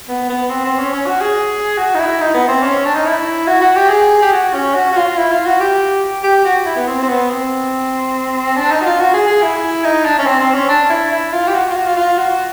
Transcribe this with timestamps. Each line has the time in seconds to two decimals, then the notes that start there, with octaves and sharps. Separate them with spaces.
0.08 B3
0.30 B3
0.50 C4
0.65 C4
0.79 C#4
0.93 C#4
1.07 F#4
1.21 G#4
1.78 F#4
1.95 D#4
1.99 E4
2.21 D#4
2.34 B3
2.48 C4
2.63 C#4
2.85 D4
2.95 D#4
3.05 E4
3.47 F#4
3.61 F#4
3.76 G4
3.89 G#4
4.22 G4
4.32 F#4
4.54 C#4
4.74 F#4
4.93 F#4
4.96 F4
5.17 E4
5.31 F4
5.45 F#4
5.60 G4
6.23 G4
6.45 F#4
6.66 E4
6.76 B3
6.88 C4
7.03 C4
7.08 B3
7.30 C4
8.57 D4
8.71 D#4
8.81 F#4
8.86 F4
9.00 F#4
9.13 G#4
9.27 G#4
9.42 E4
9.84 D#4
10.05 D4
10.19 C#4
10.26 C4
10.40 C4
10.54 C#4
10.69 D4
10.90 E4
11.12 E4
11.33 F4
11.48 G4
11.54 F#4
11.70 F4
11.76 F#4
11.86 F4
11.96 F4
12.17 F#4